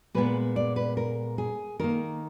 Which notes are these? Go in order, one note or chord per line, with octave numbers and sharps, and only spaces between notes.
A#2 G#3 B3 B4
D5
B4
A#4
G#4
D#3 A#3 A#4